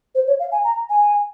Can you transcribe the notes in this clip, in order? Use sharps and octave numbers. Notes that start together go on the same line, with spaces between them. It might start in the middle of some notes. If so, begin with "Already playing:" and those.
C5
C#5
F5
G#5
A#5
G#5